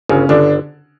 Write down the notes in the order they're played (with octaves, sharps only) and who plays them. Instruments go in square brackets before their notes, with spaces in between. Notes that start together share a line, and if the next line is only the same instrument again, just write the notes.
[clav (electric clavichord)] G1 [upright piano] C#3 C#4
[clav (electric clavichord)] G1 [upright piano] D3 D4